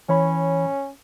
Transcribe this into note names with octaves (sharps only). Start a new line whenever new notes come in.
E3 C#4 C#5 B5